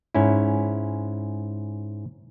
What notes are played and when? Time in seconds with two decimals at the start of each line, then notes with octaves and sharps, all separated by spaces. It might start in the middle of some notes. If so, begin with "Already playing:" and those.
0.14 G#2 C#4 E4